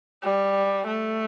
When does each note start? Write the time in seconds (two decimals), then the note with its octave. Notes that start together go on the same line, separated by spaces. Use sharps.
0.23 G3
0.87 A3